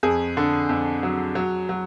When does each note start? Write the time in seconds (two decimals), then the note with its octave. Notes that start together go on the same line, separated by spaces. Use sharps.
0.03 F2 G#4
0.37 D3
0.69 F2
1.03 F#3
1.35 F#3
1.69 F#3